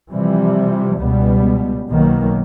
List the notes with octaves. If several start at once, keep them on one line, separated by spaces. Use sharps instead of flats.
C3 E3 F3 G3
C#2 B2 G3 B3
B1 B2 D#3 F#3 A#3